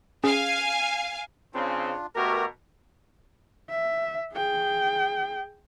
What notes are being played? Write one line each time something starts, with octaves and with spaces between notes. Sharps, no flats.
C#4 G#4 F5 G#5
C#3 C4 D4 F4
B2 A3 F#4 G4 A#4
E5
G#4 G5